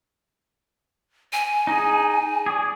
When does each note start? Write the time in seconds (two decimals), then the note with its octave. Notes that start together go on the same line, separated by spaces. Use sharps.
1.33 G#5
1.67 D#4 G#4
2.46 G#4 D5